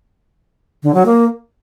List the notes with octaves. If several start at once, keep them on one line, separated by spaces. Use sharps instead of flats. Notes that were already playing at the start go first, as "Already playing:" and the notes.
D3
F#3
A#3